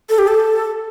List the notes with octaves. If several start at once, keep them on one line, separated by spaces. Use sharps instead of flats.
A4
G4
A4